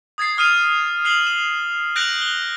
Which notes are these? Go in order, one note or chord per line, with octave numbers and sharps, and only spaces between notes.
D#6 G#6 A6 C7
D#6 F6 C7 D#7 F7
F6 C7 F7 F#7
E7
F#6 G6 A#6 D7 F7 F#7
G7